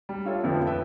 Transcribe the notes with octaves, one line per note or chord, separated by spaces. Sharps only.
G3
D4 F4 A4 C#5 E5
F2 D3 F3 B3
B4 E5 G5